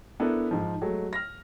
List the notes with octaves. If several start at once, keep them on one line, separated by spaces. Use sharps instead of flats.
B3 D4 E4 A4 A#4
G#2 F3
F#3 G#3 A3
F6 A#6